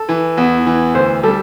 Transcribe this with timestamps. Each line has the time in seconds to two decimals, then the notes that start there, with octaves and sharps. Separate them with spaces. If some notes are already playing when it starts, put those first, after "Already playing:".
Already playing: A4
0.09 E3
0.37 E2
0.66 E3
0.95 D2 C5
1.23 G3 A4